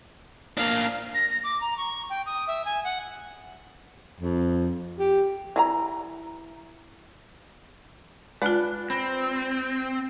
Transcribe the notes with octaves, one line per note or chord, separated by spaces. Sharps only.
A#3 D4 F5
A#6
A#6
D6
A#5
C#6
G5
D#6
E5
G#5
F#5
F2
G4
E3 F4 A#5
G#3 D4 F4 B4 F#5
C4 B5 A#6